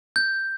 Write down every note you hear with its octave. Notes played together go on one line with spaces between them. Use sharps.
G6